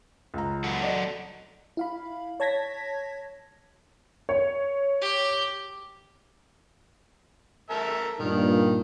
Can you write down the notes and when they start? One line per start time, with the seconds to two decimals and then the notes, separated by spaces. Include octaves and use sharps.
0.34 C#2 A#5
0.64 F#3 A4 F#5
0.83 D5 D#5
1.77 E4 F5 B5
2.40 C#5 A5 G#6 A#6 B6
4.29 C#5
5.02 G4
7.70 A#4 E5 A5
8.20 G2 A#2 D#3